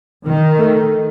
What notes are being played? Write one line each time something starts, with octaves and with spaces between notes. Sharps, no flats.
D#3
A3